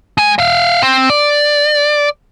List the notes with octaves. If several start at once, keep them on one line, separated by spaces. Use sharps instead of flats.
G#3 G#5
E5 F5
C4
D5